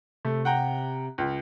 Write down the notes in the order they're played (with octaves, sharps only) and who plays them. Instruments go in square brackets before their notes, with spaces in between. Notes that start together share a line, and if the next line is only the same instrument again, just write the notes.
[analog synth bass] C3 [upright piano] A3
[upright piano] F#5 G5 A#5
C#2